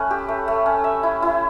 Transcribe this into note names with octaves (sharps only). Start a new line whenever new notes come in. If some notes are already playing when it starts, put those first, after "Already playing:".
Already playing: A3 C#4 A4 B4
G4
A3
A3
C#4
E5
E4
E4